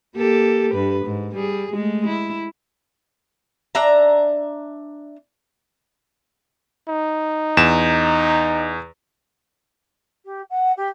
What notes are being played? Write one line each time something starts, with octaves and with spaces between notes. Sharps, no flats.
A#3 G4 A4
G2 B4
G#2
G3 G#4
G#3 A3
E4
D4 E5 A#5
D#4
E2 E7
G4
F#5
G4